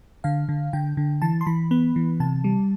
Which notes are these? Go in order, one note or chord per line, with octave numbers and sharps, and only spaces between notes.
D3 F5
D3
D3 G5
D3
E3 A5
C6
E3 B5
B3 B5
E3
C3 A5
G3